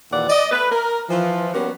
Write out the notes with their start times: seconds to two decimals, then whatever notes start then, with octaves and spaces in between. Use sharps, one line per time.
0.12 D#2 A#2 E3 D5 F#5
0.29 D5 D#5
0.52 A3 B4
0.71 A#4
1.09 E3 F3
1.54 G3 A#3 B3 C#4 F#4